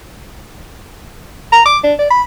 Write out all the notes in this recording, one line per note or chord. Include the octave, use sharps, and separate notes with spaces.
A#5
D6
D4
D5
B5